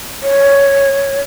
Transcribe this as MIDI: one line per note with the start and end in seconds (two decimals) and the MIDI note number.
0.23 1.18 73